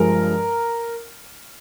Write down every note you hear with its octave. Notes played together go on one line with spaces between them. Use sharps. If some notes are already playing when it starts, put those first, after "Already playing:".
Already playing: G2 F3 G#3 A#4